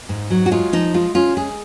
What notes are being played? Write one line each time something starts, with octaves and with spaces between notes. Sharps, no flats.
G#2
F#3
F#4
G#3 F4
F3 D#4
G#3 F4
C#4 F4
G#3 G#4